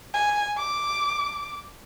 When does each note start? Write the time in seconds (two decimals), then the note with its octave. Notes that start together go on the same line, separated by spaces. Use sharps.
0.14 G#5
0.58 D6